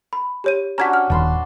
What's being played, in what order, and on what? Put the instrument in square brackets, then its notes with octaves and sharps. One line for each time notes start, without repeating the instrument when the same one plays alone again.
[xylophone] B5
G4 C#5 D#7
[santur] C#4 D4 F#4 [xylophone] A#5 G#6 B6
[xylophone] F6
[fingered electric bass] D#1 [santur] A5 B5 C6